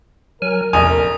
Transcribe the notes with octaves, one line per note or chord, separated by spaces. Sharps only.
F#3 A#4 G#5 F6
F1 A#1 E2 G#5 D#6